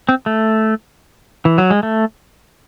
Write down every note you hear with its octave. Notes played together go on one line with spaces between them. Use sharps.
C4
A3
E3
F#3
G#3
A3